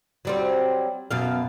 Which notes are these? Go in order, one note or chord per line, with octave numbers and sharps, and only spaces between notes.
F#3 G3 C4
F#2 B2 F5